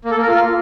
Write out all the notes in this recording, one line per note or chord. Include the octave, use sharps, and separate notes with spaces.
A#3
A4
A#3
A#4
F4